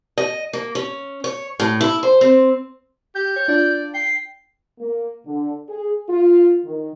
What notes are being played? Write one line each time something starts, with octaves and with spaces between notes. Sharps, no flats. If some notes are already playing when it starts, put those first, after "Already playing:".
D#5
A#3
C#4
C#5
A2
E4
C5
C4
G4 G6
C#5
D4 F4 D5
G5 C7
A#3
D3
G#4
F4
D#3